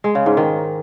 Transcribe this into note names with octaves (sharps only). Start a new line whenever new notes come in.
G#3
C#3
G#2
D#3